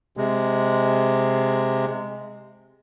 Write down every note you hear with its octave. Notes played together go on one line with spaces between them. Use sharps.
C3 G#3